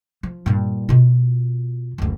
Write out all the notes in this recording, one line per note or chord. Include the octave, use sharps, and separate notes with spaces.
F3
G2 A#2
B2 F4
F#1 D2